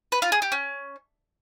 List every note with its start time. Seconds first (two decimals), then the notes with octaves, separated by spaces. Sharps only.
0.12 B4
0.22 F4
0.32 G#4
0.42 G4
0.52 C#4